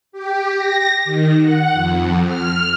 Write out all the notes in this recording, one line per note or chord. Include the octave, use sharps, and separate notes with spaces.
G4
A#6
D#3
F#5
F2
F6